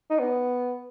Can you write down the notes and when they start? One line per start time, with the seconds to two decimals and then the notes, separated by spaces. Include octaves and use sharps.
0.10 D#4
0.19 B3